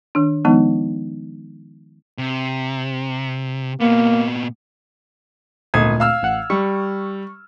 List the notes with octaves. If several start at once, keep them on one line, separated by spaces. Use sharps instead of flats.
D#3 D4
D#3 F3 G#3 B3 D#4
C3
A#2 A#3 B3
G#1 D2 A#2 A3 D#6 G#6
F5 E6 F6
A1 F#5
G3 C#6